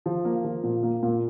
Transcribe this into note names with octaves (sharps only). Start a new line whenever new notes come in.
F3
A#3
F3
A#2
A#3
A#2